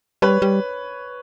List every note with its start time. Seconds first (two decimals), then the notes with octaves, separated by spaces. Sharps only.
0.22 G3 B4 C#5
0.42 G3